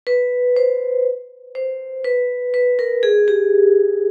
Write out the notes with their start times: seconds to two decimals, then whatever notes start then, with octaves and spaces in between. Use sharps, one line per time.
0.07 B4
0.56 C5
1.55 C5
2.05 B4
2.54 B4
2.79 A#4
3.03 G#4
3.28 G4